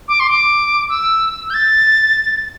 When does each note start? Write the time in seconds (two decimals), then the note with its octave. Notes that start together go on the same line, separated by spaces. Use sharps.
0.08 D6
0.20 C6
0.30 D6
0.89 E6
1.50 G6
1.54 A6